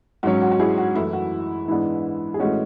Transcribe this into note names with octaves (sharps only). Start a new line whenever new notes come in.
G#2 F#3 C#4 F#4
F#4
F#4
E4 G#4
F#4
F#2 E3 A3 E4
F#4
G#2 E3 G#3 B3 D4 E4
G#4
A2 E3 G#3 C#4 F#4